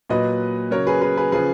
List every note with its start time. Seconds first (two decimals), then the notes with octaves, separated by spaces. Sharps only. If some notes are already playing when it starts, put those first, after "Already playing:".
0.10 A#2 F#3 B4 D#5
0.71 C#3 F#3 A#4 C#5
0.87 G#4 B4
1.01 G#4 B4
1.17 G#4 B4
1.32 C#3 F3 G#4 B4